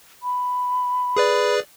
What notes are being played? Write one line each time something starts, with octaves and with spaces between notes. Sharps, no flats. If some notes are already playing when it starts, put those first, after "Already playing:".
B5
G#4 B4 D5